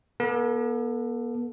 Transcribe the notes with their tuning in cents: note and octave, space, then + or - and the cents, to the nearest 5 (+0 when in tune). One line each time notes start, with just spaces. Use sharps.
B3 -45 A4 +0